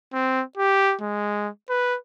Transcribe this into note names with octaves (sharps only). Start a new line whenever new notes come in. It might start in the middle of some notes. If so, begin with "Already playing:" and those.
C4
G4
G#3
B4